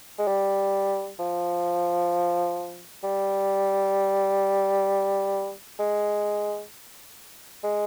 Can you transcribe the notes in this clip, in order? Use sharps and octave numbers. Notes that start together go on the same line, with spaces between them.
G#3
G3
F3
G3
G#3
G#3